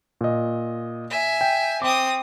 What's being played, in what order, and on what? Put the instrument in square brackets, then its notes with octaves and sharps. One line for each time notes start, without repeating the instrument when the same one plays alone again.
[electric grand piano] A#2 D#5
[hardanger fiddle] E5 G#5
[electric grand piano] G5
[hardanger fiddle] C4 D#6 [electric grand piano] D6